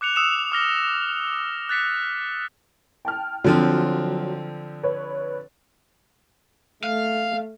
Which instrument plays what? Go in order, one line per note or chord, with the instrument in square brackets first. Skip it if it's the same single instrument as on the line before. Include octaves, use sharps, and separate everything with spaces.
[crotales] D6 F#6 C#7 F7
D#6 E6 C#7 E7 F7
D6 F6 A#6 G7
F#6 A6 B6 C#7
[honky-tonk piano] G5 A5 F6
[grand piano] D3 F3 C4 [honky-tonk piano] F#3
[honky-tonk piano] B4 C#5
[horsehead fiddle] A3 [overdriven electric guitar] F5